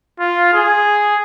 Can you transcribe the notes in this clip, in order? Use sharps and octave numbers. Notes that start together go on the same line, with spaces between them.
F4
G#4